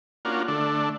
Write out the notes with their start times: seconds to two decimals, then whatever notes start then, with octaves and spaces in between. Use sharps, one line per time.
0.25 A#3 C#4 D4 F4 F#4
0.48 D3 A3 D4